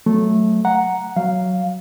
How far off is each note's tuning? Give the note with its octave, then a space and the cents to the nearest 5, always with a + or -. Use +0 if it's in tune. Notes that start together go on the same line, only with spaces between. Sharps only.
F#3 +0 A3 -10
F#5 +0 A#5 +0
F#3 +0 F5 +0